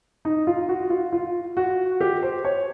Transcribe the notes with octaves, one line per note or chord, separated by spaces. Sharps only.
D#4
F4
F#4
F4
F4
F#4
G4
C5
C#5